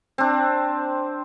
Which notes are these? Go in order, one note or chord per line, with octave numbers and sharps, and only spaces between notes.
C4 D4